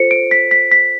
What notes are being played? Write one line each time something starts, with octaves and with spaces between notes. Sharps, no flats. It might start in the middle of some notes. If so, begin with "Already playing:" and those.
Already playing: F4 A4 C5 C#7
D7
B6
B6
B6